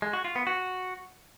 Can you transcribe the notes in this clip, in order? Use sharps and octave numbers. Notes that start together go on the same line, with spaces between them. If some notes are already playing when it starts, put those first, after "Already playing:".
G#3
F#4
F4
B3
F#4